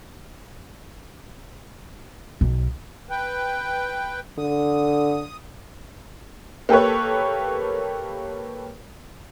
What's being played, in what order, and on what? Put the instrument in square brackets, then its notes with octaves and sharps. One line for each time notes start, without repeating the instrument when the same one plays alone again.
[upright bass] B1
[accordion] B4 G5
[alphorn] D3 [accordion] D#6
[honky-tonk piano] A#3 G4 A4 B4 C#5